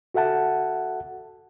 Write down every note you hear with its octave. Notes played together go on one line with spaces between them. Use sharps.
F#4 A4 E5 F#5 A5